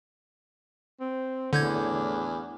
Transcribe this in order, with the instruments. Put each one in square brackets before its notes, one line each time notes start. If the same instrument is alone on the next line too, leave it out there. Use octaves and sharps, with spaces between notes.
[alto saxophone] C4
[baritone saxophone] E2 [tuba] A2 [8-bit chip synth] D3 G6 G#6 [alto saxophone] D4